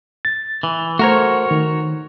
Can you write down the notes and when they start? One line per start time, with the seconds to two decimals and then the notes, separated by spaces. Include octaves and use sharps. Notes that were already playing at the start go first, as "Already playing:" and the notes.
0.25 A6
0.63 E3
0.99 A3 F#4 A#4 C5 C#5
1.51 D#3